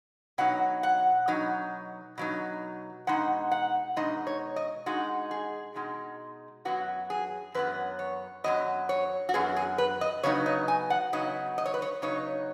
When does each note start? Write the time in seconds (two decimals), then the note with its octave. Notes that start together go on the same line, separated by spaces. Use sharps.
0.38 B2 F#3 D#4 F#5
0.83 F#5
1.28 B2 F#3 D#4
2.18 B2 F#3 D#4
3.07 B2 G#3 D#4 F#5
3.52 F#5
3.96 B2 G#3 D#4 D#5
4.27 C#5
4.56 D#5
4.86 B2 G#3 D#4 F#4
5.31 G#4
5.75 B2 G#3 D#4
6.65 F#2 F#3 B3 F#4
7.10 G#4
7.54 F#2 F#3 B3 B4
7.99 C#5
8.44 F#2 F#3 B3 D#5
8.89 C#5
9.29 F#4
9.34 F#2 F#3 B3 G#4
9.56 G#4
9.78 B4
10.01 D#5
10.23 C#3 F#3 B3 D#4 C#5
10.46 D#5
10.68 G#5
10.90 F#5
11.13 C#3 F#3 B3 D#4 D#5
11.58 D#5
11.66 C#5
11.74 B4
11.82 C#5
12.02 C#3 F#3 B3 D#4 C#5